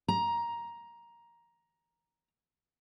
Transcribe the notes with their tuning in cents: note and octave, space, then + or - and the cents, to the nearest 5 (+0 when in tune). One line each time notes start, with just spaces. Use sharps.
A#5 +10